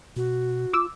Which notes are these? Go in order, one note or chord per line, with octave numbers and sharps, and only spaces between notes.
B2 F#4
F4 D6 E6